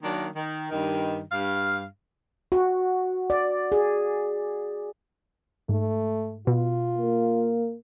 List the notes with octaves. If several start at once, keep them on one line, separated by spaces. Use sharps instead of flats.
D#3 F#3 A#3 D4
D#3
G2 D#3
G2 F5
F#4
D5
G#4
G#2 A3
B2 F4
A#3